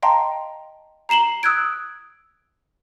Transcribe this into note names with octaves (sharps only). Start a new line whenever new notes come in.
D#5 F5 G5 A5 A#5 C6
A#5 C7 E7 F#7 G7
D#6 E6 F#6 G#6 D7